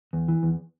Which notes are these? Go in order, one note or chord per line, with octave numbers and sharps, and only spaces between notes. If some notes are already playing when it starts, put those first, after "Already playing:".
E2
E3
E2